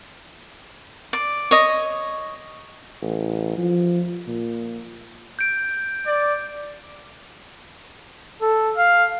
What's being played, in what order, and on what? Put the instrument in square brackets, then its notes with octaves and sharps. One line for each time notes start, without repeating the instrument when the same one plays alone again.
[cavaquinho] D5
C#5 D#5
[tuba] A1
F3
A#2
[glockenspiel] G6 D7
[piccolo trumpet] D5
A4
F5